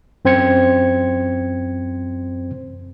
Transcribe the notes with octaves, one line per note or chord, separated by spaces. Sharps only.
F#2 C4 C5 G#6 C#7